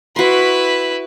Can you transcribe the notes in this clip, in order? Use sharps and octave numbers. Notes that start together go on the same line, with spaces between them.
E4 F#4 B4 C6